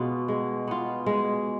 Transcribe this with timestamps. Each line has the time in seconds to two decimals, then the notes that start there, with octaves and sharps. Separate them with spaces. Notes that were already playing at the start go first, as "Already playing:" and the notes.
Already playing: B2 G#3 B3 F4
0.28 G#3
0.67 B3 F4
1.06 G#3